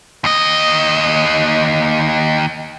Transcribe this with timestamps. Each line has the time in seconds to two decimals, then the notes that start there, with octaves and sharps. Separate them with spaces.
0.24 D#2 D#5